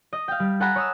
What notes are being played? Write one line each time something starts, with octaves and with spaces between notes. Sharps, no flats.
D#5
F5 G5
G3
A4 F#5 G#5 A#5 B5 F#6
C#5 D#6 E6